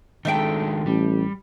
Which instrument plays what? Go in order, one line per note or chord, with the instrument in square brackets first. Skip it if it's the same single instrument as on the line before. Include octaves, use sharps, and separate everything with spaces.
[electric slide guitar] D#3 G#3 D4 [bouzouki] A3 E5 G5
[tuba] A1 [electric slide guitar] G3